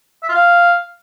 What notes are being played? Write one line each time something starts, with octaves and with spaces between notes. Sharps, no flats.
E5
F4
F5